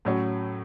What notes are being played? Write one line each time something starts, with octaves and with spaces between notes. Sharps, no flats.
A2 F#3 C#4